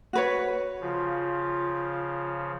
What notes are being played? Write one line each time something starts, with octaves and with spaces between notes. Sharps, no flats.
F#4 B4 C#5
C#3 F3 F4